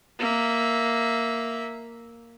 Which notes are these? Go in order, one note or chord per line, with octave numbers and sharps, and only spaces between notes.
A#3 E5